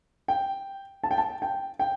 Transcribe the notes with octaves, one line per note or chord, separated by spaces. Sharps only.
G5
A5
G5
A5
G5
G5